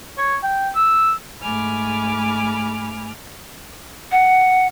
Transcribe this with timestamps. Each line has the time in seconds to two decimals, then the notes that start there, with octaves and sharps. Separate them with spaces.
0.18 C#5
0.43 G5
0.75 E6
1.42 G#2 A3 G#5 B5 D6 F6
4.12 F#5